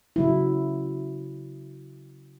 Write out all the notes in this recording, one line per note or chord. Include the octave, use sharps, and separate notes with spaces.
C#3 F#3 E4